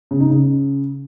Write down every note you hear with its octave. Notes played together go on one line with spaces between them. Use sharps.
C#3
D#4
C#3